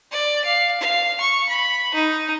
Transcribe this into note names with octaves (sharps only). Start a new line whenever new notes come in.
D5
F5
F5
C#6
B5
D#4